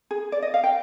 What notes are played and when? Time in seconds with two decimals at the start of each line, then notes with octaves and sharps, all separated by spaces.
0.11 G#4
0.32 D5
0.42 D#5
0.54 F5
0.64 G5